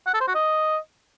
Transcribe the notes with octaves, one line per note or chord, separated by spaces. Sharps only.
F#5
A4
C5
F#4
D#5